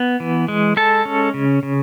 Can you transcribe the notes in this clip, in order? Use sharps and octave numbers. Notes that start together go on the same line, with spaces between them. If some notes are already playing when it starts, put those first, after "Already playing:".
Already playing: B3
E3
G#3
G#3 A4 A5
C#4
C#3
C#3